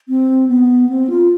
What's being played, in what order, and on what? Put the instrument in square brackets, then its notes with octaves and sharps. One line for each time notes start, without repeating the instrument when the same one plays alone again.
[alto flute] C4
B3
C4
F4